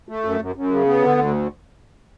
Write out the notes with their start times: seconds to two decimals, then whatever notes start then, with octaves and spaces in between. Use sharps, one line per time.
0.09 A3
0.24 F#2
0.40 F#2
0.56 F#2
0.71 C#3
0.86 B3
1.02 D3
1.17 D2